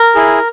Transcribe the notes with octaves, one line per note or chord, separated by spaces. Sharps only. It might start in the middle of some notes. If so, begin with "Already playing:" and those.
Already playing: A#4
E4 G#4